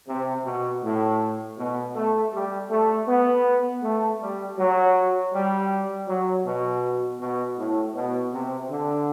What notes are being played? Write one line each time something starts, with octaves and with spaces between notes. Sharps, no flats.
C3
B2
A2
B2
A3
G3
A3
B3
A3
G3
F#3
G3
F#3
B2
B2
A2
B2
C3
D3